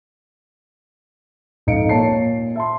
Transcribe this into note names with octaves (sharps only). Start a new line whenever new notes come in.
G#1 F2 D#4 F5 C#7 D7
A#2 C#5 A5 C7
E5 A5 C6